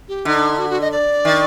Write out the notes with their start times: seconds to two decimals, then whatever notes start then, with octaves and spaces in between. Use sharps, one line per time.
0.09 G4
0.25 D3 D#4
0.58 F#4
0.70 F#4
0.81 D#5
0.92 D5
1.25 D#3